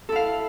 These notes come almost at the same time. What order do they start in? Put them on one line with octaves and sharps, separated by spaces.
A4 E4 F5